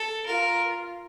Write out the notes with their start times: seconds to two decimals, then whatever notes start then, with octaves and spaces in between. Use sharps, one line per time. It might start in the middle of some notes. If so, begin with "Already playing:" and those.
Already playing: A4
0.26 F4 A#4